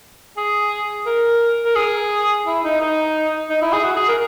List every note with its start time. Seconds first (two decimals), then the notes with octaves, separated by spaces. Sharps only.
0.37 G#4
1.06 A#4
1.65 A#4
1.75 G#4
2.46 E4
2.64 D#4
2.80 D#4
3.50 D#4
3.62 E4
3.73 G#4
3.84 F#4
3.96 G#4
4.08 A#4